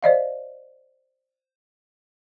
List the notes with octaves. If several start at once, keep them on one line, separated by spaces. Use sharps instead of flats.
C5 D5 D#5 F5